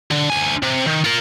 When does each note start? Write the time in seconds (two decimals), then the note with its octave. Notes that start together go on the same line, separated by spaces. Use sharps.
0.11 D3
0.30 D2 G#5
0.63 C3
0.87 D#3
1.05 F4 A#4